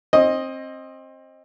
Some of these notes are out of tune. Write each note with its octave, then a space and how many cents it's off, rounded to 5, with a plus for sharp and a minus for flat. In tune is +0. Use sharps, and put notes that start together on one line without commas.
C4 +25 D#5 +0